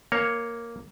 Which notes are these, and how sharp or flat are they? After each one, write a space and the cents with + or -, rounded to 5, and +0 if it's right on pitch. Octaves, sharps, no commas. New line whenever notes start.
A#3 +0 C#5 +0